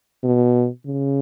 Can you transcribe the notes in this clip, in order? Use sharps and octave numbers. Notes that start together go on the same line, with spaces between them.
B2
C#3